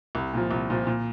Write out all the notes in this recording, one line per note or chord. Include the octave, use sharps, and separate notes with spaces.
C2
A#2 F3
C2
A#2 F3
A#2